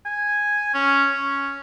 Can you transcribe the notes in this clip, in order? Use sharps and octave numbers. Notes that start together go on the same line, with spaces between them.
G#5
C#4
C#4